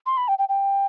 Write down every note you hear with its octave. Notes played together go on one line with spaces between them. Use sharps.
C6
B5
G5
G5
G5